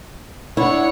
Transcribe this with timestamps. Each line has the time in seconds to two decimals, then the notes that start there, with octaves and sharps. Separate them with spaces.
0.57 D4 E4 C#5 F#5